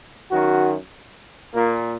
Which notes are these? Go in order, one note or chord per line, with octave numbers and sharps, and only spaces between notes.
F#2 D#3 F#4
A#2 A#3